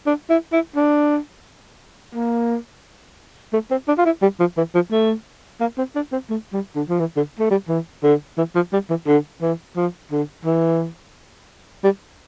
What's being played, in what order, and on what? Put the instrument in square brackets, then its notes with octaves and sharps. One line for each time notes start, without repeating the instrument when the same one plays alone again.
[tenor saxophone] D4
E4
E4
D4
A#3
A3
C4
D4
F4
E4
G3
F3
E3
F3
A3
A#3
C4
D4
C4
A3
G3
D3
F3
E3
D3
A3
G3
E3
D3
E3
F3
G3
E3
D3
E3
F3
D3
E3
G3